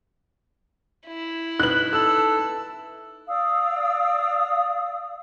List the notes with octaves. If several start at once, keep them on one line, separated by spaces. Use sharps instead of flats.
E4
D#4 B4 F#6 F#7
A4 E6
D5 F5 D#6 E6